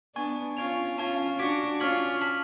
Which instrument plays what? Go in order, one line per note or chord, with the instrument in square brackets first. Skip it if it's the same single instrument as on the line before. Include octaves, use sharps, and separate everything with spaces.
[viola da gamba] B3 D4 [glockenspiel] G#5 C#6 G#6
[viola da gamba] C#4 F4 [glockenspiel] C#6 G#6 D7 F7
[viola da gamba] C#4 F4 [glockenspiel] A5 C#6 G#6
[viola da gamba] D4 F#4 [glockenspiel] D6 G#6 B6 D7
[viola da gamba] C#4 F4 [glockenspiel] C#6 F6 G#6 B6 F#7
[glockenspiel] A5 F6 B6 F#7